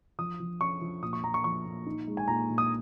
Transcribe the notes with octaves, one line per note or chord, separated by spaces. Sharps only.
F3 D#6
F3
C#4 C#6
F3
A#2 D#6
C#6
A#2 A#5
C#6
F3 C#6
A#2
D#4
G#3
G#5
A#2 A#5
A#2
D#6